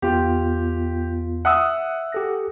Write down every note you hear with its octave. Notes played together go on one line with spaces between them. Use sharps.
E2 B3 F4 G4
E5 F#5 D#6 E6
G4 A4 A#6